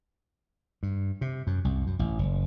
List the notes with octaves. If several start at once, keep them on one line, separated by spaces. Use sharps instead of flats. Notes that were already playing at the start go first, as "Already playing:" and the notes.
G2
C3
F#2
C2
F#2
A1
F#1